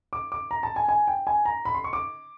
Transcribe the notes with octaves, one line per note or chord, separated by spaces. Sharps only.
D6
D6
A#5
A5
G#5
G#5
G5
G#5
A#5
B5
C6
C#6
D6